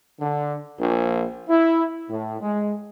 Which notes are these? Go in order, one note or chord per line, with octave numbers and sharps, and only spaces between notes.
D3
A#1
E4
A2
G#3